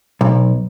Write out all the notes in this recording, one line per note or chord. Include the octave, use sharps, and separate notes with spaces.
B1